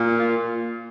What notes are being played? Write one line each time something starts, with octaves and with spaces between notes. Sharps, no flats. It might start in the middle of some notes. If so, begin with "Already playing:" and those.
Already playing: A#2
F4